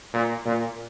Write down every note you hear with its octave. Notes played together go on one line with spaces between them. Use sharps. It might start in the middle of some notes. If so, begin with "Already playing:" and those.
A#2
A#2